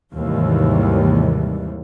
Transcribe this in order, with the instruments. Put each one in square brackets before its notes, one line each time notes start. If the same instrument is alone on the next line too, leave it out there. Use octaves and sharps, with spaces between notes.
[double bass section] D#2 G#2 C3 E3 G3